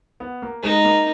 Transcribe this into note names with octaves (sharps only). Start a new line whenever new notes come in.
B3
A#3
G#3 D#4
A#3